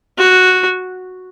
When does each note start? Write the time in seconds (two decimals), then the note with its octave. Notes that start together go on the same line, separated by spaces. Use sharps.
0.18 F#4